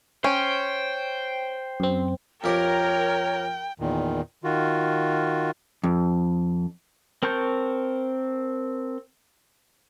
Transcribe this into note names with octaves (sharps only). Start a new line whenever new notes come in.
C#4 C5 G5
F#2 C4
F2 G4 A#4 C#5 G5
E2 A#2 D#3
D#3 F4 F#4
F2
C4 A#4 A5 C#6 G6